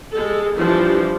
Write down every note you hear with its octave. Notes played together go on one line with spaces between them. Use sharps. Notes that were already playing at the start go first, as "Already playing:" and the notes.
G#3 A4
E3 F3 G3 D4